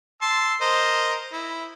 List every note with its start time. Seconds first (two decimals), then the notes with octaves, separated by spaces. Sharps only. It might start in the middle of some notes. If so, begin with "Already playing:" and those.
0.22 A5 C6 E6
0.61 A#4 C5 D#5
1.33 E4